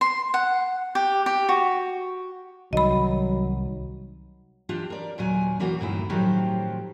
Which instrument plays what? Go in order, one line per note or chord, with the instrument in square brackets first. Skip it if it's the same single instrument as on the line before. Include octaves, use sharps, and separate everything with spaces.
[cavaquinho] C6
F#5
G4
G4
F#4
[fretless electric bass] C2 D#3 [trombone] F#3 [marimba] D#5 B5
[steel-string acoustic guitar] E3 D4 F4 G4
A#4 D5
D#2 A#2 F#3 G#5
C3 E3 A#3 F#4
D2 G2 A#2 D#3 E4
A2 D#3 F3 F#3 C4 G4